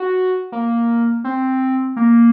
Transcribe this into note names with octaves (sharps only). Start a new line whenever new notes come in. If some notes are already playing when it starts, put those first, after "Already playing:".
Already playing: F#4
A#3
C4
A#3